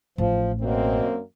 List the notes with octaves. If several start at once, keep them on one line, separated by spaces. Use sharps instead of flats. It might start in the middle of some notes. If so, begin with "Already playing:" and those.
A1 F3
F#2 B2 A#3 C4